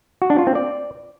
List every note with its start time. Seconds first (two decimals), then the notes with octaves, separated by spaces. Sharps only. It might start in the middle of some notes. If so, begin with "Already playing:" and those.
0.22 F#4
0.30 D4
0.38 F4
0.47 C4
0.55 D5